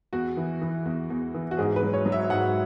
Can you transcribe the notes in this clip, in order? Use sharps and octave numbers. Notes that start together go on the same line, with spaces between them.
E2 F#4
E3
E3
E2
E2
E3
F#4
G#2 G#4
B4
F#3
C#5
F#3
E5
G#2 F#5